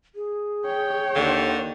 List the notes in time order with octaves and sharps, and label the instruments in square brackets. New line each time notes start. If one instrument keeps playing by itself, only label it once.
[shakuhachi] G#4
[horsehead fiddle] C#5 G5
[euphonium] D#2 [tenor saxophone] D3